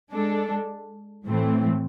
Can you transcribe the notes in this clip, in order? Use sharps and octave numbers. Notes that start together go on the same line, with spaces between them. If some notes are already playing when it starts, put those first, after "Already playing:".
G#3 D4 A4
A2 E3 A3 C4